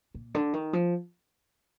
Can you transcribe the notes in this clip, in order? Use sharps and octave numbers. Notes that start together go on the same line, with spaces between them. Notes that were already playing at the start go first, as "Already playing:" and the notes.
A#2
D3
D#3
F3